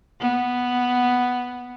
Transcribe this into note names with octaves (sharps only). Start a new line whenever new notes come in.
B3